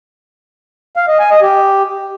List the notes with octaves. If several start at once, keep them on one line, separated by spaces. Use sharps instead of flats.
F5
D#5
G#5
D#5
G4